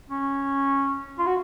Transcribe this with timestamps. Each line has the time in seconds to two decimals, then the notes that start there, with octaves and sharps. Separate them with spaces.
0.10 C#4
1.19 F4
1.27 F#4